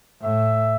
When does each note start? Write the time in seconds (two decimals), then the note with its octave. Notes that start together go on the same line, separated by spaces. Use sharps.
0.22 A2 E5